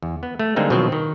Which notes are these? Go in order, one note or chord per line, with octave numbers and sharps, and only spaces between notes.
E2
B3
A3
D3 G3 G#3 A#3 C4 D#4
B2 D#3 F3 F#3 C4
D#3